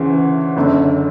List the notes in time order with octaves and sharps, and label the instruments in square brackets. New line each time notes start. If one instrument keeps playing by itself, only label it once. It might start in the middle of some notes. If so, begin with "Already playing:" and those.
Already playing: [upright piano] D2 C#3 E3
F#1 F#2 D3